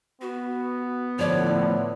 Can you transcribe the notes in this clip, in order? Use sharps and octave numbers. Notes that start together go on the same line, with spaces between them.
B3 F#4
A2 D3 F3 C#5 D5